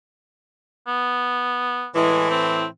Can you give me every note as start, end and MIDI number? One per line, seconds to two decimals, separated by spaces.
0.88 1.89 59
1.95 2.64 45
1.95 2.64 52
1.95 2.29 56
2.31 2.65 60